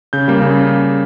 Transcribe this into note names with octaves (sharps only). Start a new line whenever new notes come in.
C#3 G6
G3 A#3
C#3